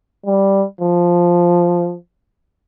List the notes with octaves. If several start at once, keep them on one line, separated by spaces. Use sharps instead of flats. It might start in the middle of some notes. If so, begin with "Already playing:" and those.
G3
F3